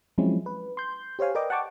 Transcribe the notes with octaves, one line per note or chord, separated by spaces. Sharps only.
F3 F#3 G#3 C4 C#4 E4
B4
C6 G6
G4 C5 C#5 F5 G#5
A#4 B4 D5 D#5 G5 D6
F#5 G5 A5 C#6 D6